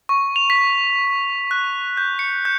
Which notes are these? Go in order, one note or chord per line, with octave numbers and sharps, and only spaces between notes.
C#6
F7
B6
F#6
G6
C#7
G6